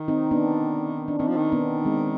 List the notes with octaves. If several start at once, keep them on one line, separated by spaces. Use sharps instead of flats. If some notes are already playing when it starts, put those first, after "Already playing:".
Already playing: D#3
C4 D#4
B3 D4
D4
D#3 C4 D#4
F3
D#3
B3 D4
G#3 C4